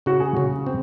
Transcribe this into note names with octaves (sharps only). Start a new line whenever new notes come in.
C#3 F#4
G#4
C#3 F#4
C4